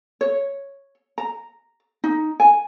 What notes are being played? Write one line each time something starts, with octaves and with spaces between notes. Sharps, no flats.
C#5
A#5
D#4
G#5